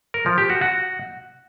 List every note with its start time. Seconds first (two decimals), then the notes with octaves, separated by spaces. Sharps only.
0.14 A#4
0.26 F3
0.38 G4
0.50 F#4
0.61 F#4